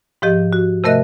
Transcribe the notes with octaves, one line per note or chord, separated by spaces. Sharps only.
G#2 F3 G4 D#5
F#4
C3 A3 A#4 D#5 E5 F#6